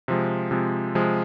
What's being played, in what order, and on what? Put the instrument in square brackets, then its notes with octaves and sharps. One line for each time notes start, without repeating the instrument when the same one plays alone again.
[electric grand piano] C3 F3 G#3
C3 F3 G#3
C3 F3 G#3